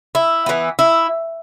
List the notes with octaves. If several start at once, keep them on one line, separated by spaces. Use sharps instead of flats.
E4
E3 G#3 B3
E4